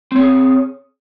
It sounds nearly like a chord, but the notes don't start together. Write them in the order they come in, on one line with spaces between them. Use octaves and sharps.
C4 C#5 G#4